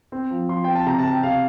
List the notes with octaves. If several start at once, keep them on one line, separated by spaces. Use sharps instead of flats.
C4
F3
F3 C6
C4 G5
A5
C3 A#5
A5
C3
G5
C3 F5